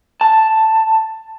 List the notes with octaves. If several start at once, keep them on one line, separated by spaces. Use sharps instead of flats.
A5